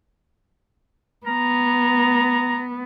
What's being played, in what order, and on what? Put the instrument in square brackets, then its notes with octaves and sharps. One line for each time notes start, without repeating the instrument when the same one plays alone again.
[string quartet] B3 [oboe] A#5